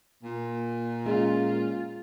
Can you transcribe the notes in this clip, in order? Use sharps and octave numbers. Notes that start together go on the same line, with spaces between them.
A#2
G#3 C#4 F4